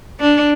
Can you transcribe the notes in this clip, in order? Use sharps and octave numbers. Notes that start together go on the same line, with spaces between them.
D4